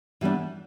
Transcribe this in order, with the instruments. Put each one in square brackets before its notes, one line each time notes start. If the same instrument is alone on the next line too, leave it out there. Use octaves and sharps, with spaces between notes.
[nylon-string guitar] E3 G3 B3 D4